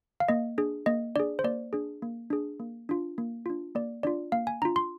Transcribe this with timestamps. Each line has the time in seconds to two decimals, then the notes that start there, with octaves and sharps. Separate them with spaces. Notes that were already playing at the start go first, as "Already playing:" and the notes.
0.20 F5
0.29 A#3 D#5
0.58 D4 G#4
0.86 A#3 D#5
1.16 D4 G#4 D5
1.39 C5
1.44 A#3 D5
1.73 D4 G#4
2.02 A#3
2.30 D4 G#4
2.60 A#3
2.89 D4 F4
3.18 A#3
3.46 D4 F4
3.75 A#3 D5
4.03 D4 F4 D5
4.32 A#3 F5
4.47 G#5
4.62 D4 F4 A#5
4.76 C6